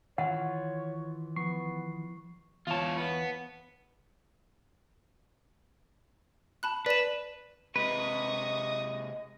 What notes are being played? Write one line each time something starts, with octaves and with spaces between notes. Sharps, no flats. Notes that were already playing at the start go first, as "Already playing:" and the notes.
D#3 E3 F4 C#5 F#5
F3 B3 C#6 C7
E2 F4 C#5 A5
B3
A5 B5 F#6
B4 D5 E7
C3 G#3 B4 D#5 C#6 D#6